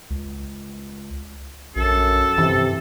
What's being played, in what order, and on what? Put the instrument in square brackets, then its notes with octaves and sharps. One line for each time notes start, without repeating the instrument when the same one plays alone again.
[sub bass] C#2
[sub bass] A#1 [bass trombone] F#2 [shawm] A4
[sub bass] G2 [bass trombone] C3 [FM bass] E3